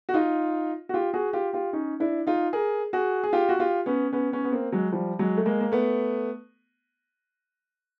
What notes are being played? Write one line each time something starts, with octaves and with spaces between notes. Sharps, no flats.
F#4
D#4 F4
F#4
F4 G4
F#4 G#4
F4 G4
F4 G4
C#4 D#4
D4 E4
D#4 F4
G#4 A#4
F#4 G#4
G#4
F4 G4
F#4
F4 G4
B3 C#4
B3 C#4
B3 C#4
B3
A#3 C4
F#3 G#3
F3 G3
F#3 G#3
A3
G#3 A#3
A#3
A3 B3